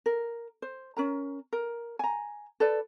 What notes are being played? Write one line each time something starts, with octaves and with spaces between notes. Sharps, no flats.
A#4
C5
C#4 A#4 A#5
A#4
G#5 A#5
A4 B4 D5